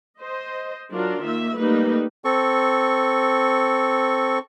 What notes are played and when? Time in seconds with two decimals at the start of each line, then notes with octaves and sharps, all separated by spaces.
0.19 C5 D#5
0.91 F#3 D4 F4 A#4
1.21 D#3 A#3 E5
1.56 G3 A3 A#3 D#4 B4
2.25 C4 A4 C#6